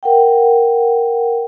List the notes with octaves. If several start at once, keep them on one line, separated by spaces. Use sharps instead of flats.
A#4 F#5 G5